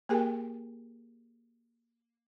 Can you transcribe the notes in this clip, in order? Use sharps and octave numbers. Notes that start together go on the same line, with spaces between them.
A#3 G4 G#4 A#4 G5 G#5